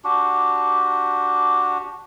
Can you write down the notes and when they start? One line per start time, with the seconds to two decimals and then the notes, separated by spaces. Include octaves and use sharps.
0.04 D4 F#4 G4